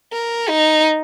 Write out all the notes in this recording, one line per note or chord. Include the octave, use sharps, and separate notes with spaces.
A#4
D#4